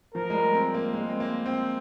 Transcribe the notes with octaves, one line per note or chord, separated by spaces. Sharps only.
F3 A#4
G#3
G3
C4
A#3
G#3
C4
A#3
C4